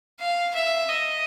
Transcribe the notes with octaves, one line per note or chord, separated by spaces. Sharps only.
F5
E5
D#5